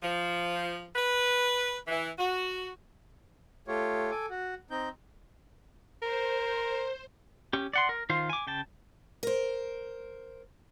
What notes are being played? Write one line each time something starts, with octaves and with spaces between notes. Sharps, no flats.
F3
B4
E3
F#4
A3 F4 G4 C#5
A4 G#5 D6
F#4
C4 D#4 G6
A#4 C5
C#4 G4
D5 F#5 C6
A#4
D#3 F4 C5 F5
G#5 D6
C#3 G5 A5
A#4 C5